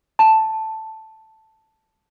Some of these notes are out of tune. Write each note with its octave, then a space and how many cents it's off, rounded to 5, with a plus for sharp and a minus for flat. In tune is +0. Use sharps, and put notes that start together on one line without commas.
A5 +0